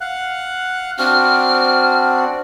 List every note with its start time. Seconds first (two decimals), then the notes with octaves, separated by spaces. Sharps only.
0.01 F5 F#5 F#6
0.99 C4 D4 F#4 F6